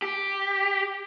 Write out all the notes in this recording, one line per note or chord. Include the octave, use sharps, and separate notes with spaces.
G4